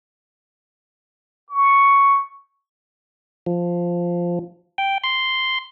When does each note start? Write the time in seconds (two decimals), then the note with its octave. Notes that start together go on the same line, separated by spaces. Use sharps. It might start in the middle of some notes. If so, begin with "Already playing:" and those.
1.49 C#6
3.46 F3
4.78 G5
5.04 C6